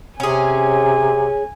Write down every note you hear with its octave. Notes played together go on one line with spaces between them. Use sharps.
C3 C#4 G#4 G#5